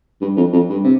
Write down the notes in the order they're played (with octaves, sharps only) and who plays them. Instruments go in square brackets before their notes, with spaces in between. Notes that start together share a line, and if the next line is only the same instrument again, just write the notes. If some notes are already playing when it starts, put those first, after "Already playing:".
[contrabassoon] G2
F2
F2
G2
C3